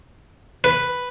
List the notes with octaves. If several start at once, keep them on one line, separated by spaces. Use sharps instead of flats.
B4